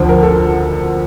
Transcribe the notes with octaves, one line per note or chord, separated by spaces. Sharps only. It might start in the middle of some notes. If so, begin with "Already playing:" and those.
Already playing: D2 D3 F3 C5
A#4
A4